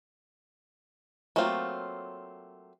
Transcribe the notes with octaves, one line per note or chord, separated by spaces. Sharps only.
F#3 A3 A#3 C4 F4